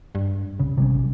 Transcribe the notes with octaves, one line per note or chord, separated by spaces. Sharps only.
G2
C2 C#3
A1 C3 G3 C#4
B1